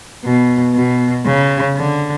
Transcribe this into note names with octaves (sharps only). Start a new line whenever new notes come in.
B2
B2
C#3
D3